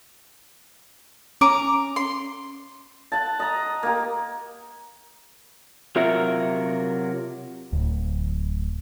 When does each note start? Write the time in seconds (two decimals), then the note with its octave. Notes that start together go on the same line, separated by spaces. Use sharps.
1.41 C#4 A#5 D6
1.96 C6
3.12 F#5 A5
3.40 D#5 A#5
3.83 A#3 G4
5.96 C3 F#3 F4 A#4 E5
7.73 D1